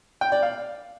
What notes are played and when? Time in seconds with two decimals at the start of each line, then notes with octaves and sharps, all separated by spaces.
0.21 G5
0.32 D5
0.42 F5